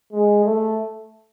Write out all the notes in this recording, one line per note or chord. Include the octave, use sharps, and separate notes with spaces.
G#3
A3